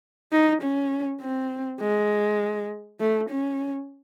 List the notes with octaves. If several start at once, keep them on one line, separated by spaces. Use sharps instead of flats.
D#4
C#4
C4
G#3
A3
C#4